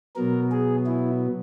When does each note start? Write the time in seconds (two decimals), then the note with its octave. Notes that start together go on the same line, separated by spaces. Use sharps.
0.16 B2 F#3 B3 A#4
0.51 G#4
0.86 E4